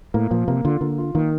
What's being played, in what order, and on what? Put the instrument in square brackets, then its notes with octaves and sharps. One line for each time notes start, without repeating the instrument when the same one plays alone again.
[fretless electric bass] A2 [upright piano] A#3
[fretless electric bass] A#2 [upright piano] F3
[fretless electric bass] C3 [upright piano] A#3
[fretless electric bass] D3 [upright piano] F4
[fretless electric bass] D3 [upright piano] A#3
[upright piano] F4
[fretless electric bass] D#3 [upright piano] A#3